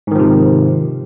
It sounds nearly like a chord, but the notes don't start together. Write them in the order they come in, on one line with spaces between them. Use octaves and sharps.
G#2 D#3 F3 C3